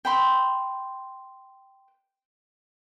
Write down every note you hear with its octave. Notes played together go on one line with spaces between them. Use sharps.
G5 B5 C6